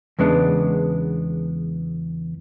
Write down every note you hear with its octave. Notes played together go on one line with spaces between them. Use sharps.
E2 C#3 G#3 B3 D4